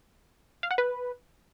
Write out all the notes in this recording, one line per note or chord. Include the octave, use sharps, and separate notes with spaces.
F5
F#5
B4